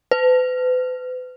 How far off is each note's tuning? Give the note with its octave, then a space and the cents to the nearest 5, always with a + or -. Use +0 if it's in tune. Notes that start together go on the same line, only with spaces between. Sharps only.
B4 +40